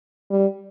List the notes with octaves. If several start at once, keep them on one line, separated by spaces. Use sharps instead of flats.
G3